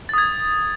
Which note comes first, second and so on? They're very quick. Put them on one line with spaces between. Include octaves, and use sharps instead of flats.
A6 D#6 G#6